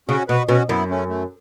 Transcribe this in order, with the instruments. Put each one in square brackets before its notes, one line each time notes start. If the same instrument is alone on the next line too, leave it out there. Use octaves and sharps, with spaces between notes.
[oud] C#3 [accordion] C#4 F#4
[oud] B2 [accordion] F#4 B4
[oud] B2 [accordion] C#4 F#4
[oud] F#2 [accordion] B3 E4
[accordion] A3 C#4
A3